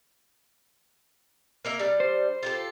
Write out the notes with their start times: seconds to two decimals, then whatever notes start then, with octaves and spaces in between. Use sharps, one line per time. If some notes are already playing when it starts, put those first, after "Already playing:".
1.65 A#3 A#4 E5
1.79 G3 D4
2.00 C5
2.43 F4 G4 A4